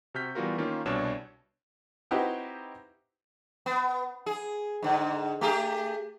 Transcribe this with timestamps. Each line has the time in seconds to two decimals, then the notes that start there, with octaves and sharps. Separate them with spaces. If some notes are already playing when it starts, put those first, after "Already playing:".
0.14 C3 F#4 F6 G6 B6
0.35 E3 G3 B3 F4 F#4 A#4
0.58 D#3 A#3 C#4 F4
0.86 C2 B2 D4 C#5 D5 E7
2.11 C4 D#4 E4 F#4 G4 B4
3.66 B3
4.26 G#4
4.83 G#2 D3
5.41 A3 G4 G#4